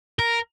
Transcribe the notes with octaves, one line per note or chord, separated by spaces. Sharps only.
A#4